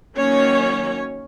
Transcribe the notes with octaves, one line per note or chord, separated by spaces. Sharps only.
D#3 F#3 A#3 C#4 C#5